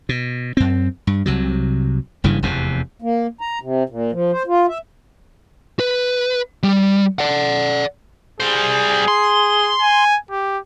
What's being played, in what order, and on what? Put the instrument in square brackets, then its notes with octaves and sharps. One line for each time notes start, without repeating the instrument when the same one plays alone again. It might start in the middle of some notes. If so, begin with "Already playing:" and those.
[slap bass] B2
F#2 C4
G2
C2 C3 F#3
F#1 G2 C#3 E3
F1 E2 C3
[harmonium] A#3
A#5
C3
A#2
F3
C5
F4
E5
[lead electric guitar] B4
G3
D5 F#5
[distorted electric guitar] G3 C5 [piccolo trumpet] G#4
[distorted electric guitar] C6
[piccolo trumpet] G#5
G4